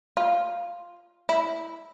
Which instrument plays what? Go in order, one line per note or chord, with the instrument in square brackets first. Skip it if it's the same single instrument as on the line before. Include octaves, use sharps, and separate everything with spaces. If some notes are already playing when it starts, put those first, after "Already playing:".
[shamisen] F4
E4